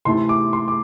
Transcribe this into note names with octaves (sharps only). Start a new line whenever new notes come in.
C3 E3 A3 E4 C6
D6
C6
D6